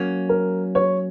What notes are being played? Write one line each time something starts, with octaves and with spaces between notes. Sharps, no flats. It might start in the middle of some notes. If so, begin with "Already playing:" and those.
Already playing: F#3 A#3 C#4
A#4
C#5